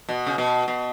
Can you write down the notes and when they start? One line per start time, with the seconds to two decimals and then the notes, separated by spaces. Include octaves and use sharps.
0.09 B2
0.27 C#3
0.38 B2
0.68 B2